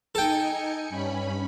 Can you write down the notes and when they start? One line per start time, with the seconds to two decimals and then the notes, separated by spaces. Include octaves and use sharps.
0.15 D#4 A4 G5 G#5 C#7
0.89 G2 C#4 B5